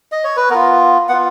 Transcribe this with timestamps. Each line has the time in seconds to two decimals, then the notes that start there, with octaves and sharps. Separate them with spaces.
0.12 D#5
0.24 C#5
0.37 B4
0.50 B3 F4 A#4
1.09 B3 F4 F#5